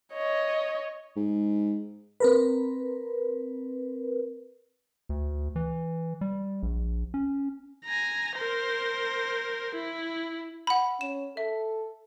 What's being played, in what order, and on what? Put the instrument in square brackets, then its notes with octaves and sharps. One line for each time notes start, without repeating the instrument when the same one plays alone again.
[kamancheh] C#5 D#5
[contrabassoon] G#2
[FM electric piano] C4 A#4 B4
[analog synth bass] D2
E3
G3
A#1
C#4
[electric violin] G#5 A#5
A#4 C5
E4
[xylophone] F#5 B5
[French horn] C#4 [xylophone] E7
[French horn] A4 [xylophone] E5